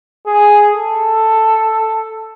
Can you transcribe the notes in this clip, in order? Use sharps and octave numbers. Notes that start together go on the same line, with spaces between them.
G#4
A4